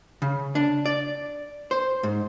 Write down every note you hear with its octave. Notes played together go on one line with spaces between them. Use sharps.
C#3
D4
D5
C5
G#2